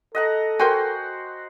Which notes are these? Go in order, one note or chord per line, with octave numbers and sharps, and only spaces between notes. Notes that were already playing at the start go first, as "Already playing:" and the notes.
A4 D#5 F#5 A#5
F#4 A#4 C5 G5 G#5